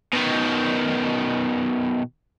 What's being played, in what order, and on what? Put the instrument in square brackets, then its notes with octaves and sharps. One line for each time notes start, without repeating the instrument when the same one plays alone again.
[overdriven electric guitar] B2 D#3